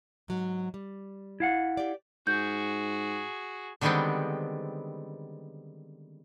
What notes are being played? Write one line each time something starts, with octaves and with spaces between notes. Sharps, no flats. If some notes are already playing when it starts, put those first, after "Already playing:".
G#2 F#3
G3
E4 F5 F#5
G4 D5
G#2 F#4 G#4 G6
D3 D#3 G3 G#3 B3 C4